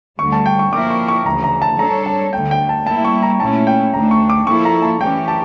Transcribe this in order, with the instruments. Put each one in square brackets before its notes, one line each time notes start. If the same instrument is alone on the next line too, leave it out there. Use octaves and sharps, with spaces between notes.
[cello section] D2 D3 G3 [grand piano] C#6
[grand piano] A5
G5
C#6
[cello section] F3 A#3 E4 A#4 [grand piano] D6
[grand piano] C#6
C#6
[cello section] D2 C#3 E3 [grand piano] A#5
[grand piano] A#5
A5
[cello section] G3 D4 A4 C#5 [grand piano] A#5
[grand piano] A5
[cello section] D2 D3 A3 [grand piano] G5
[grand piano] G5
A5
[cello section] G3 A#3 E4 [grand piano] A5
[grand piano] C#6
A#5
[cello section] A#2 A3 C#4 E4 [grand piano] A5
[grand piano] G5
[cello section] D2 D3 A3 D4 [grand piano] A#5
[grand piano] C#6
D6
[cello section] F3 A#3 E4 A4 [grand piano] C#6
[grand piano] A#5
A5
[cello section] E3 A3 C#4 G4 [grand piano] G5
[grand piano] A5